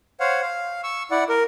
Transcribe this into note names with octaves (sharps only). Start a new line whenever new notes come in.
C5 C#5 F5 F#5
F5
C#6 E6
E4 D5 F#5
A#4